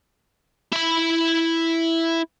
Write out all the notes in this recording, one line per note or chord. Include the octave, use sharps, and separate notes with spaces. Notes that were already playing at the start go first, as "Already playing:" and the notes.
E4 B5